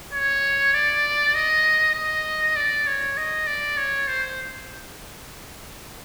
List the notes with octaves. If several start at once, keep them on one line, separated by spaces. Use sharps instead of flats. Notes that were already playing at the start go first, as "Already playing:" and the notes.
C#5
D5
D#5
D#5
D5
C#5
D#5
D5
C#5
C5